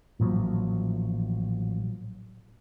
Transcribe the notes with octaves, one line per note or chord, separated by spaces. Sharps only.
A1 A#2 F3 F#3